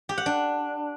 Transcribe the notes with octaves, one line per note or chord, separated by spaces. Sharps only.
G4
F#5
D4